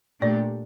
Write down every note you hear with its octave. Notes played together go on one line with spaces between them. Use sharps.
A#2 A3 D4 G4 D5